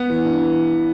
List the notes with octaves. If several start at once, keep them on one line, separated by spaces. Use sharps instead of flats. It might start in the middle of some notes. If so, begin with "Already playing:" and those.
Already playing: B3
E3
G2
E3